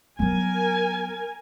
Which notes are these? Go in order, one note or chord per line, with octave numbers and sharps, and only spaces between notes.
F#3 B3 A#4 G#5